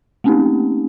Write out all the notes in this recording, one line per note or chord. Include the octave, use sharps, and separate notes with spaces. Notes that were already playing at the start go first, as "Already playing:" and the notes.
A3 A#3 C4 C#4 D#4 G4